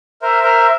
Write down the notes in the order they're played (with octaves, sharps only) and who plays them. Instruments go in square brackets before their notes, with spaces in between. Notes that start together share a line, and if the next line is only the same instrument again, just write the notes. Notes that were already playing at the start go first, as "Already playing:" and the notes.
[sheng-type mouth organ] A#4 C5 [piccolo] E5
[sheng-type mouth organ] A#4 C5